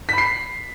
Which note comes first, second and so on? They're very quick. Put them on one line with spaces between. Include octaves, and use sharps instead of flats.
B6 B5 C7